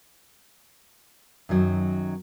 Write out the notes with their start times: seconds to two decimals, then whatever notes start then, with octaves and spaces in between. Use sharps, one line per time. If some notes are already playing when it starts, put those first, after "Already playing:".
1.49 F#2 D#3 F#3